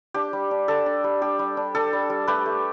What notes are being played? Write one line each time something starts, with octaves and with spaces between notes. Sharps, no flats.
D4 G4
G3
D4
D4 A4
D4
G3
D4 G4
G3
D4
D4 A4
G3
G3
A3 G4 B4
A3